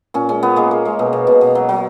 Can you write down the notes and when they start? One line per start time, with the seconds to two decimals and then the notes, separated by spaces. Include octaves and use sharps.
0.14 A#2 C#4
0.29 G#3 C#4
0.43 A#2 B3
0.56 G#3 A#3
0.71 G#3
0.85 G#3
0.99 B2
1.13 B2
1.27 B2
1.41 B2
1.55 F#3
1.69 F#3